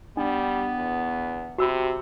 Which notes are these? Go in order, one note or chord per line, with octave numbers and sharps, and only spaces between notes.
G3 B3 D4
E2
C3 F#4 B5 E6